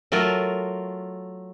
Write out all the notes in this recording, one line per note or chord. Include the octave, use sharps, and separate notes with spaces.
F#3 A3 F4 A#4